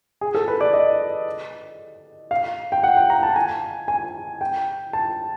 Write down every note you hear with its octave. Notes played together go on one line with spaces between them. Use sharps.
G#4
A4
B4
D5
D#5
F5
G5
F#5
G5
A#5
A5
G#5
G#5
G5
A5